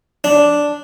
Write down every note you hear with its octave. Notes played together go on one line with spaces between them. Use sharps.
D4